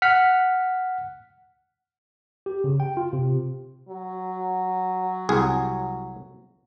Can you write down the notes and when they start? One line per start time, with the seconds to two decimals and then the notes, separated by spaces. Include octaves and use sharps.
0.02 F#5 F6 B6
2.46 G4
2.64 C#3
2.80 G5
2.97 F4
3.13 C3
3.89 F#3
5.29 C2 G#4